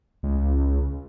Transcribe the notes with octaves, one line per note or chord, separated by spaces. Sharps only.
C#2